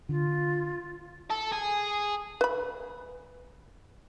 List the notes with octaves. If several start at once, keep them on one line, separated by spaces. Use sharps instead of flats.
D3 F4
A4
G#4
B4 B5